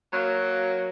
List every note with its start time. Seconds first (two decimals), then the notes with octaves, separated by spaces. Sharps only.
0.13 F#3 A#3